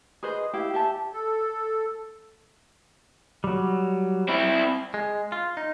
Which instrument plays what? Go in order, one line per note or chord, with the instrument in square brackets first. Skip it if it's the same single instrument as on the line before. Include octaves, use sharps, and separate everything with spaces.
[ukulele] G#4 B4 C5 D#5
E4 G4 F5
G4 E5 A5
[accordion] A4
[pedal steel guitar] F#3 G3
[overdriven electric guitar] C4 E4
[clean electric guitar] G#3
F4
D#4